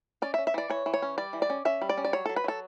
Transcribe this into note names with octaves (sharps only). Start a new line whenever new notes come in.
C#4 D5
E5
C#4
E5
E3 D5
E3 C#5
E3
C#5
C#4
G3 D5
E3
D5
C#4
C#4 E5
G3
D5
C#4
D5
F#3 C#5
F#3 A4
B4
F#3 A4